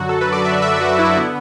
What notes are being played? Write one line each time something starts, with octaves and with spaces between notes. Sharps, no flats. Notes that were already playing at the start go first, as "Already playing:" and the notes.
Already playing: F#2 D3 F#3 F#4
A4
B4
D5
E5
E5
F#4
E4
D3 B3